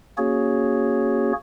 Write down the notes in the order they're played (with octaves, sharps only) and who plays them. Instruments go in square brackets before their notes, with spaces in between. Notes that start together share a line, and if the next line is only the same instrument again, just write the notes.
[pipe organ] A#3 C#4 F#4 G#4 C#5